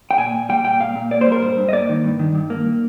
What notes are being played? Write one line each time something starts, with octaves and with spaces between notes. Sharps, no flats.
G5
A#2 G#5
A#2
G3 G5
A#2 G5
A#2 F5
A#2
A#3 D5
C5
G3
A#4
G2 C5
G2
D#5
A#3 D5
D#3
G2
D#3
G2
A#3